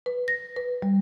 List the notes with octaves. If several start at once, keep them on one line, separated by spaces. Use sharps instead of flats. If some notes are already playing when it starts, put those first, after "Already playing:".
B4
A#6
B4
G3